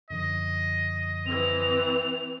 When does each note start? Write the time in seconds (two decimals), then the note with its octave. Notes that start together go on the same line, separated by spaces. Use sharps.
0.10 F#2 D3 F3 D#5
1.26 E3 C4 F7